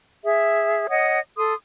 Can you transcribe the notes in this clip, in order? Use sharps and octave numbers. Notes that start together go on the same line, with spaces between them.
G#4 E5
C#5 D#5 F#5 D#6
A4 C6 D#6